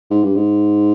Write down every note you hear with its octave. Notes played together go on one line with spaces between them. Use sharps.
G#2
G2
G#2